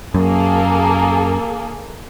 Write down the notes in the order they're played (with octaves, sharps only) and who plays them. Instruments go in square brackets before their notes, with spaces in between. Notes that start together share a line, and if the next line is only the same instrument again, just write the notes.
[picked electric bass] F#2 [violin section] A#3 G#4 A4